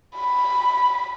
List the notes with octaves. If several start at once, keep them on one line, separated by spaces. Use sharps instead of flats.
B5